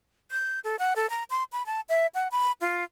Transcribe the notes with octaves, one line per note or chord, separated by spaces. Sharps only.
G6
A4
F#5
A4
A#5
C6
B5
A5
E5
F#5
B5
F4